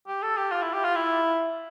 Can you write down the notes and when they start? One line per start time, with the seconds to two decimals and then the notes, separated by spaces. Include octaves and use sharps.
0.08 G4
0.22 A4
0.37 G4
0.52 F4
0.62 E4
0.73 G4
0.84 F4
0.95 E4